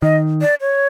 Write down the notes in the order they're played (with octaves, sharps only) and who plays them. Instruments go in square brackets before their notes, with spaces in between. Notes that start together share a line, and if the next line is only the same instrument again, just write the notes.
[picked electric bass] D#3 [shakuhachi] D#5
[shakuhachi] D5
C#5